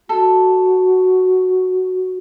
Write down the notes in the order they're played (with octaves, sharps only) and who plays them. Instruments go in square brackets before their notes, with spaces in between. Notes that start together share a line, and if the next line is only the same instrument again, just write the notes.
[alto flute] F#4 [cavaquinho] A4